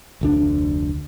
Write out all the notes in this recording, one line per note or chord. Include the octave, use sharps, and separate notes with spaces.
F1 D2 D4